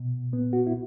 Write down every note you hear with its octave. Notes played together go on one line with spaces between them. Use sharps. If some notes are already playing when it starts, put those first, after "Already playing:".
Already playing: B2
A#2 B3
F#4
E4